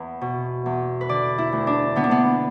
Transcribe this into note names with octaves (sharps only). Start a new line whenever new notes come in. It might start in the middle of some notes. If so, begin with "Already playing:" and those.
Already playing: E2 B4
B2
E2
B4
D3 D5
E4
D2
D4
D3 B3
D4
B3